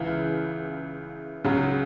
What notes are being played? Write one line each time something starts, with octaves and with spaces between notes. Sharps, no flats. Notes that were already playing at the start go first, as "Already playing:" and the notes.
Already playing: C#2 C#3 E3
C#2 C#3 F#3